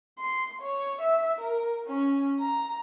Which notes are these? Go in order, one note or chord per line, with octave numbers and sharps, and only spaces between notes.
C6
C#5
E5
A#4
C#4
A#5